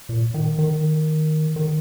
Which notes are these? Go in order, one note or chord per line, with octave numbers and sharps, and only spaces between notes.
A#2
D#3
D#3
D#3